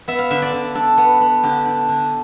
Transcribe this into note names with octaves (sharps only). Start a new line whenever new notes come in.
B3 E5
F5
D3 E5
D5
D3
D4 A4
B3
B3
D3 G4
D4
D3